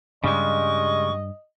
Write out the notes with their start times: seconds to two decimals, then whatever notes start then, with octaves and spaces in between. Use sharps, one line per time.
0.24 G2 C#3 G3 G#3 D#5 C#6